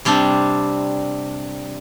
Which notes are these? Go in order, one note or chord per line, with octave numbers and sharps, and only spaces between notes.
C3 G3 C4 D4